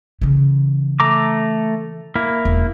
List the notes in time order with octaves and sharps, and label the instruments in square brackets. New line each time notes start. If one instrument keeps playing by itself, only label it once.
[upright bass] C#3 E3
[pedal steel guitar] A3 A#5 D6
A#3 E4
[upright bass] E1